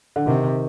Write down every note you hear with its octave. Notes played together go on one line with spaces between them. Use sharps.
D3
C3 D#3